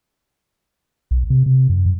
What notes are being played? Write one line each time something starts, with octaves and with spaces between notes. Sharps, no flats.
B1
C3
C3
F#2
F#2